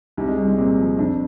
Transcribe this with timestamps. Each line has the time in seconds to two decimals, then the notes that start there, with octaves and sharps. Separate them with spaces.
0.17 C2 G3
0.28 G#3
0.37 C2
0.48 G#3
0.58 A#2 C4
0.78 F3
0.99 F2 D4